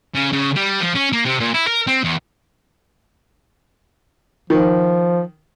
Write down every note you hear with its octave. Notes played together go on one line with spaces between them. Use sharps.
C#3
C#3
G3
F3
C#4
A#3
C3
A#2
E4
A#4
C4
E2
D#3 F3